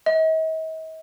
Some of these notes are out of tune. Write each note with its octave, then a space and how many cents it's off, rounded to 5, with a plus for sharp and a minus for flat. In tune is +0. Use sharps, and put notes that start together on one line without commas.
D#5 +45